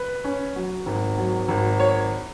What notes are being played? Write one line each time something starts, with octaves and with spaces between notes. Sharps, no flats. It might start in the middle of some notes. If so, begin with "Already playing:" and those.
Already playing: B4
C#4
F#3
G#1
F#3
G#1
C#5